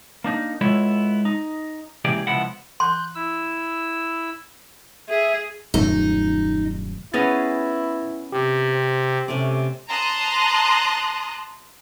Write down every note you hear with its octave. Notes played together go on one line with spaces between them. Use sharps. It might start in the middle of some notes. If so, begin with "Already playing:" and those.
A#3 D4 D#4
G#3 B3 E4 F4 A4 C#5
D#4
C#2 E3 A#3 G4 G#4 D5
C#3 F3 G#3 B3 E4 F#5
C6 F#6 G6
E4 E6
G#4 E5
D#1 F#2 A3 D#4
B3 C#4 E4 G#4 A6 A#6
C3 G4
C4
C3 A3 C#4 D5
A5 A#5 C6 D#6 F#6